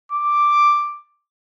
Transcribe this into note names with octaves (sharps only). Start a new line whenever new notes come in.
D6